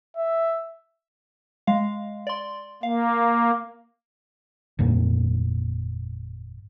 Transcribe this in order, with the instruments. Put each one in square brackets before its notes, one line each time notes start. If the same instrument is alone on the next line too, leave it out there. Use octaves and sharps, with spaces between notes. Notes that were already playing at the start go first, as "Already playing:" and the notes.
[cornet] E5
[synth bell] G#3 F5
D5 C6
[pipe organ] A#3 [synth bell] F5
[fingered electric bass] G1 F2 A#2 A#3